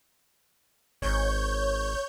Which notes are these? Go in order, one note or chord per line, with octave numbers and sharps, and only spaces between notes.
G#1 C#5 G6